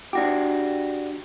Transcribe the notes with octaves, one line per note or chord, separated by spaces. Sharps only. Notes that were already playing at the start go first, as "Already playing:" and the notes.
D4 F#4 G4